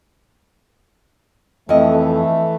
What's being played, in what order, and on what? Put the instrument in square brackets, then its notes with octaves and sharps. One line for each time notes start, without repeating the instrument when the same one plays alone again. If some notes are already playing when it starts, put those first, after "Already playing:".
[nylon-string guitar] F2 D#5 [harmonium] E3 A3